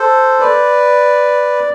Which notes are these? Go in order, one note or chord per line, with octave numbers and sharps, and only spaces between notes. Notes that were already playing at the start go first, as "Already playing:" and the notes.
Already playing: A4 C5
B4 D5